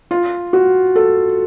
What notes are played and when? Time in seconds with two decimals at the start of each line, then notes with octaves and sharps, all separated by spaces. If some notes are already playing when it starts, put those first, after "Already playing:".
0.11 F4
0.53 F#4
0.96 A4